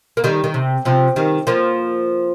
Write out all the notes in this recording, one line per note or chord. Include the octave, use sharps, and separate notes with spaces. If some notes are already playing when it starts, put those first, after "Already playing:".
A#3
D#3 G3
D#3
C3
C3 F3
D#3 G3
F3 A#3